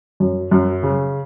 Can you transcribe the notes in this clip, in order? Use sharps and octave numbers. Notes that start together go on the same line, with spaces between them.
F#2
F#2
C#3